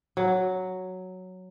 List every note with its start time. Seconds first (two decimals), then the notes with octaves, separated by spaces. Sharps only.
0.17 F#3